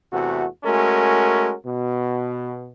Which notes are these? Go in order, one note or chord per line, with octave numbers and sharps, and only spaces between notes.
E2 C3 A3 F#4
G#3 A3 C#4 F#4 A#4
B2